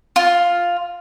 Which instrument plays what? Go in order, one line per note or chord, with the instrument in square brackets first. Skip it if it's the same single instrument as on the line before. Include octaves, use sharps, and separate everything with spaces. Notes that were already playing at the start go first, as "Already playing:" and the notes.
[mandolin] F4